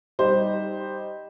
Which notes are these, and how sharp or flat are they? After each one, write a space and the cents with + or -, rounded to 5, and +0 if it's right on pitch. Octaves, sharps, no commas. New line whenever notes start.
G3 +0 D#4 +0 C5 +0